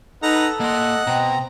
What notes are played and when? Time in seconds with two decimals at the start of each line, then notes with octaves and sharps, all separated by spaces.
0.23 D#4 A4 B4 F#5 A#5
0.60 A#3 D#5 F#5 C6
1.07 B2 C4 A#5